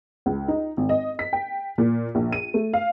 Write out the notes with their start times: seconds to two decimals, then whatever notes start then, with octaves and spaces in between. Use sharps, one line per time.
0.26 C#2
0.48 D#4
0.77 G#1
0.89 D#5
1.19 B6
1.33 G5
1.78 A#2
2.15 A#1
2.33 D#7
2.54 A3
2.73 F5